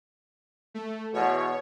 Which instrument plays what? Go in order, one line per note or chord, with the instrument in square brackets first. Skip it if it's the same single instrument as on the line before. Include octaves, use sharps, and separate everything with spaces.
[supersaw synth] A3
[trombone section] E2 B2 [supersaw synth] C#5